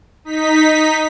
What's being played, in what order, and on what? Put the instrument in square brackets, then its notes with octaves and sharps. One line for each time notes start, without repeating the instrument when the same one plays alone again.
[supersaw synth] D#4 B6